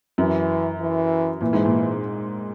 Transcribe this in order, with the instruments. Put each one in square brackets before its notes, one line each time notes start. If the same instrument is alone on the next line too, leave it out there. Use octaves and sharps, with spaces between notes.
[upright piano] F#2 [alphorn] E3
[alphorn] E3
[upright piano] A#2 [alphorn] E3
[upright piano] G#2
A#2